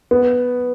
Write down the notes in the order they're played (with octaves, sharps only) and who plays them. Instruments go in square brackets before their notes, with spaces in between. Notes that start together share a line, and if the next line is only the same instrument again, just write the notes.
[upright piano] B3